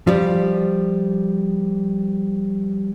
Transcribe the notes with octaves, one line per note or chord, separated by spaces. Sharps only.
F3 G3